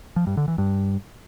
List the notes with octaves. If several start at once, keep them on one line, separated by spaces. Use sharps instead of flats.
F3
G2
D3
E3
G2